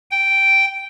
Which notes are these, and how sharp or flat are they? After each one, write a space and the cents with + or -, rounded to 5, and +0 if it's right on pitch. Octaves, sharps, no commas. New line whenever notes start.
G5 -5